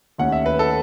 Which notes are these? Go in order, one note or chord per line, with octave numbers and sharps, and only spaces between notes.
D#2 D#3 A3 C#4 F#5
E5
B4
A4